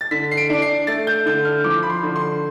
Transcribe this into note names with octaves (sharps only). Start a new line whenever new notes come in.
A6
D3 B6
C7
D7
D4 D7
C7
A3 A6
G6
D3 G6
F6
F3 D6
B5
C6
D3
C6